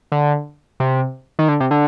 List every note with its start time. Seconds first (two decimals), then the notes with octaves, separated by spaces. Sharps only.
0.12 D3
0.80 C3
1.39 D#3
1.49 D3
1.60 C3
1.71 D3